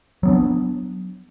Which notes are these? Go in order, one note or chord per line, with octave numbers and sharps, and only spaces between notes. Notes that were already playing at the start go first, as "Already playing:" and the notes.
F#3 B3 D4